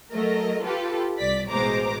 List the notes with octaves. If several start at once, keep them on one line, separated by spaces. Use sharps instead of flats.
F#3 A3 A#4 D#5
F4 G4 A4 B4
C2 D5 B6
A1 B2 G#3 C5 A#5 D6